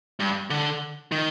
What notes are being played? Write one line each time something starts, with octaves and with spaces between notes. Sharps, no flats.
G2
D3
D#3